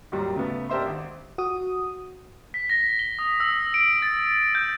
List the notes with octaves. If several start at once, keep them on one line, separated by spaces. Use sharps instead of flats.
D#2 G#2 D#3 F#3 G3
C#3 A3 B3
D4 G4 A#4 C5 E5 C6
G#1
F#4 D#6
B6
A#6
G7
D#6
E6
D7
A6
G6